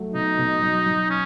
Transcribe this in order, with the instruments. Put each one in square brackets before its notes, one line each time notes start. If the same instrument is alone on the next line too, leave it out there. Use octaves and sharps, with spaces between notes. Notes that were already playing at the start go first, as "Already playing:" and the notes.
Already playing: [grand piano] F#3 A3
[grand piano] B2 [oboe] D#4
[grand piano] B2
F#3
F#3
[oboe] C#4